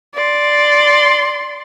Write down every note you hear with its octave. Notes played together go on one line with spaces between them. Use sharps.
D5 C6